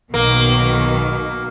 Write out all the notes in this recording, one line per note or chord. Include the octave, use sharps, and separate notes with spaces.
B1 B2 D#3 A#3